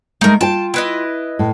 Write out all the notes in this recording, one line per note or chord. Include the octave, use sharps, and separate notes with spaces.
G#3 A3 D#4 A#4
F4 G5 A5
E4 B4 D#5
A2